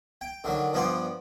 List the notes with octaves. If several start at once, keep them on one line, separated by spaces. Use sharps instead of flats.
G5
D3 D#3 F#3
G2 F3 B3 D5 G5 C6